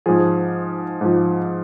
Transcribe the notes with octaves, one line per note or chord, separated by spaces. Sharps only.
G#2 F3 G#4
G#2 F3